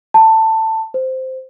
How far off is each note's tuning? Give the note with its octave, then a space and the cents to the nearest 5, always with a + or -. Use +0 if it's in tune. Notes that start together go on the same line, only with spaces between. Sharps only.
A5 +15
C5 -5